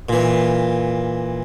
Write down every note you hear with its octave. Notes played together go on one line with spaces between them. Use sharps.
A#2 E3